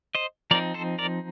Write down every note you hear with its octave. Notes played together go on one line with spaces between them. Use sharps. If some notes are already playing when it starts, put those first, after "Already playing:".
C5 D#5
F3 C4 D#4 A#4 D5
A4 C5
A#4 D5